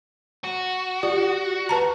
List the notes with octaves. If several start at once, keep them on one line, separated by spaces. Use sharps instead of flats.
F#4
F4 G4 D5
B4 A5 A#5